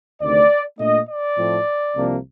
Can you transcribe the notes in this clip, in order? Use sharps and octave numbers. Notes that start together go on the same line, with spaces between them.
D2 C3 D#3 A3 C4 D5
A#2 A3 D4 D#5
D5
A2 F3 A3 C4
C2 C3 F3 A#3 D4